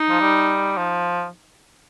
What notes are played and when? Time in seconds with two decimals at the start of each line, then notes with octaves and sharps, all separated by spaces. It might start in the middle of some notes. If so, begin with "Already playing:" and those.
Already playing: D#4
0.09 F3
0.21 G3
0.77 F3